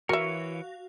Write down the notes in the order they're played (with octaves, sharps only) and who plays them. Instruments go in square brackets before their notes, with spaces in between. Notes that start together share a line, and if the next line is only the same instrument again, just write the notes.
[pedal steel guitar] E3 C#5 [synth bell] F#4 F5 [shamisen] A#4 E5